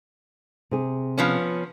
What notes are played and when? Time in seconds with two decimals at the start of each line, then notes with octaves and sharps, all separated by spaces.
0.71 C3 G#4
1.18 F3 B3 C#4